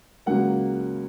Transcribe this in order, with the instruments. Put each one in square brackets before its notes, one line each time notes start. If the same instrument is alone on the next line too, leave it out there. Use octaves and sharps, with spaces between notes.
[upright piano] C#2 C#3 F#3 A#3 F#5